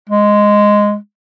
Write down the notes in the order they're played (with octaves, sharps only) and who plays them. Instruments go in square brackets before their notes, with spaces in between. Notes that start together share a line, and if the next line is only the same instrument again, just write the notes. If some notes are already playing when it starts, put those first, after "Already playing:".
[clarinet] G#3